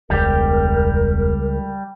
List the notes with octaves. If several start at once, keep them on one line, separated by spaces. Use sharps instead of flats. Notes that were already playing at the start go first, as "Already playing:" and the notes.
E1 C#2 G3 G4 A#4